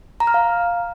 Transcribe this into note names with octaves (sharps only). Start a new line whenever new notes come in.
A#5
F6
F5